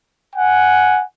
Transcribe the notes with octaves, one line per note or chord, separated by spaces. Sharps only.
F#5 G#5